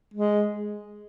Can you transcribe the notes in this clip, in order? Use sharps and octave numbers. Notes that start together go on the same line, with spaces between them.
G#3